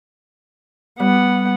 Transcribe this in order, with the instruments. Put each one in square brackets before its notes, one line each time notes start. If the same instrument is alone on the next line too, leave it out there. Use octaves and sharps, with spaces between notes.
[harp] G3 [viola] B3 F#5